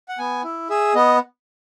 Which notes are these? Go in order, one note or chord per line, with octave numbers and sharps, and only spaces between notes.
F#5
B3 G#5
E4
G#4 E5
B3 D#5